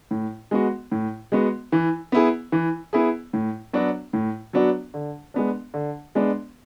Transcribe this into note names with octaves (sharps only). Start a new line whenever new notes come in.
A2
G#3 B3 F#4
A2
G#3 B3 F#4
E3
B3 E4 G#4
E3
B3 E4 G#4
A2
F#3 B3 D4 F#4
A2
F#3 B3 D4 F#4
D3
G#3 B3 D4
D3
G#3 B3 D4